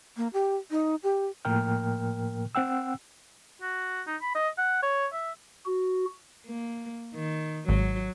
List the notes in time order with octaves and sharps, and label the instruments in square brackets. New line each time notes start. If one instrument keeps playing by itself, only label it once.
[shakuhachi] A#3
G4
D#4
G4
[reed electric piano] A2 F3 A#3 A#4 G5 F6
C4 F#5 G5 E6
[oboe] F#4
D#4
B5
D#5
F#5
C#5
E5
[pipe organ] F#4
[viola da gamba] A#3
D#3
[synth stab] G#1 [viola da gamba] F#3